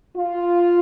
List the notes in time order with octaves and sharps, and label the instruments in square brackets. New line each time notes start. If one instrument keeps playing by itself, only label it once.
[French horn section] F4